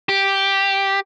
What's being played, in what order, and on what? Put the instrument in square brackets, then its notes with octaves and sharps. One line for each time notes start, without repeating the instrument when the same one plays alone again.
[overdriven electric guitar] G4